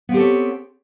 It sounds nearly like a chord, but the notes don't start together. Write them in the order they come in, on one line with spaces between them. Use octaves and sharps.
B3 C4 G4 A4 C#5